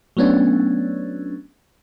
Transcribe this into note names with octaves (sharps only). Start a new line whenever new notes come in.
F#3 A3 B3 C#4 D4